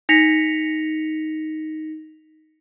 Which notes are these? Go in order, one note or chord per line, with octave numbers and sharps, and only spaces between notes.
D#4 A#6 B6 C#7 F7